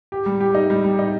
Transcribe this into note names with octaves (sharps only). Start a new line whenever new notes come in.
G4
G3
G4
D#4
G3
G3
D#4